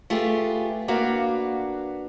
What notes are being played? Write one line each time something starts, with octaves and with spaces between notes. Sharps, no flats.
A3 F4 G4 G#4 B4
A#3 D4 F#4 B4 F5